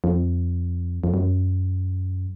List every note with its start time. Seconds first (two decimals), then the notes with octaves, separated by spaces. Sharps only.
0.04 F2
1.04 F2
1.14 F#2